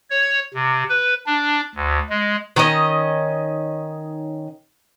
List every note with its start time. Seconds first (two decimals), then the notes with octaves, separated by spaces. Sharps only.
0.10 C#5
0.54 C3
0.89 B4
1.26 D4
1.75 D2
2.09 G#3
2.56 D#3 C#4 D#5